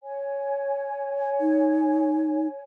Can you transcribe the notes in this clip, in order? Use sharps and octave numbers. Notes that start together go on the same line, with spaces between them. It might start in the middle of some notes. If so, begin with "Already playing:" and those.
C#5 G#5
D#4